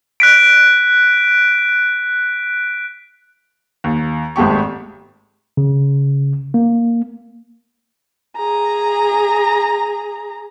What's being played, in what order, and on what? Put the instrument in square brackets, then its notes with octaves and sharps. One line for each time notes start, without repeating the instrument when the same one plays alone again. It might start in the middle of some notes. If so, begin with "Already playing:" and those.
[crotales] F#6 B6 D7
[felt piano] D#2
G#1 G#3 A3 G4 C#6
[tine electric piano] C#3
A#3
[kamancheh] G#4 A#5